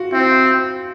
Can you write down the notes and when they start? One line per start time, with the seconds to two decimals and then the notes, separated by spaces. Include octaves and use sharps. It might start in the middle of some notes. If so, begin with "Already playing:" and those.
Already playing: F4 F#4
0.12 C4 E4